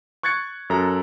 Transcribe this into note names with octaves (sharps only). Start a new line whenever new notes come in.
C#6 F#6 G#6 A6 C#7
F#2 A4 A#5